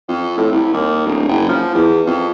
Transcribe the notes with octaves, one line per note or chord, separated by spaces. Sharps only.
F2
A2
C2
D#2
D1
F#1
F3
E2
F2